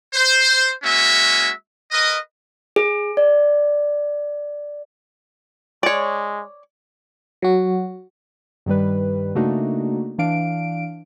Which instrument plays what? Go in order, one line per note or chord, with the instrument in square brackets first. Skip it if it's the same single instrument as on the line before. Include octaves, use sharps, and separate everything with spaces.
[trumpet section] C5
G#3 A#3 C#4 F#4 E5
A#4 B4 D#5
[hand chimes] G#4
D5
[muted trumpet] G#3 [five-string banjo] C#5 D5
[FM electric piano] F#3 F#4
[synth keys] G2 D#3 G3 B4
C#3 A3 A#3 D4 D#4 F#4
E3 D4 F5 D7